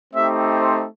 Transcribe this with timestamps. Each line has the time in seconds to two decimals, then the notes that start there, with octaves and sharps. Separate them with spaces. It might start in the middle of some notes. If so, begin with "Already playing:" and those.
0.13 A3 C4 D#4 G4 E5
0.58 C5